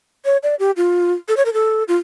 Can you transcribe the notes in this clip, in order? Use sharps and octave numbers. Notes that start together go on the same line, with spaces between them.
C#5
D5
G4
F4
A4
C#5
A#4
A4
F4